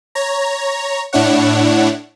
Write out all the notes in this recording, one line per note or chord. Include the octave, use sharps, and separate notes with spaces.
C#5 A#5
A2 D4 E4 C#5 F#5